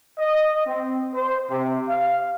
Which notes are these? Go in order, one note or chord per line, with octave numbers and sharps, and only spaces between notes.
D#5
C4
C5
C3
F5